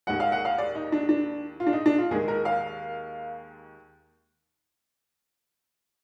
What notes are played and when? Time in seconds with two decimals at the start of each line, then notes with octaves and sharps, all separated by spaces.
0.07 D#2 D#3 G#3 F#5
0.20 F5
0.32 F#5
0.45 F5
0.58 D5
0.75 D#4
0.92 D4
1.09 D4
1.60 F4
1.67 D4
1.73 D#4
1.86 D4
1.98 F4
2.11 D#2 D#3 G#3 G#4
2.28 A#4
2.45 F5